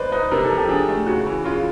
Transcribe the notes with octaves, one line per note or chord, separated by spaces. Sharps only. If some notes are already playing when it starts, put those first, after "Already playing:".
Already playing: B4 C5 D5 D#5
D#4 B4
C3 A#4
A4
F3
G4
D4 G#4
A3
C#3 F#4
E3
C#3 F4